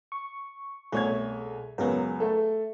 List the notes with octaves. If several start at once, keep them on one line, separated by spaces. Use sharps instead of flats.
C#6
C2 B2 A3 G#4 C#5 G#6
C#2 F#2 F#3 B3 G#4 A#4
A3 A4